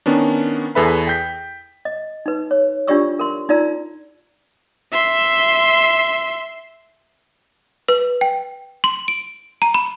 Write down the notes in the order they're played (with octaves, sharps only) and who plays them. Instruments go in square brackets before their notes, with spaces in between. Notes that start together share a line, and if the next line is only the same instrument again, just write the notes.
[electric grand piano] D#3 B3 C#4 D4
E2 G#4 A4 B4 E5 B5
G5 G6 B6
[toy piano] D#5
D#4 B4
C#5
D4 F4 G4 D5 C#6 E6
A#4 C6
D#4 F4 D5 A#5 E6
[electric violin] E5 C6
[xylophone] B4
G5
C6
D7
A#5
B5